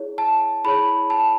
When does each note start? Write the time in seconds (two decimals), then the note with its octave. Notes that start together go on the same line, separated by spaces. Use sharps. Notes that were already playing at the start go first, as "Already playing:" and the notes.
Already playing: E4 G#4 C#5
0.18 A5
0.64 E4 G#4 C#5 B5
1.10 A5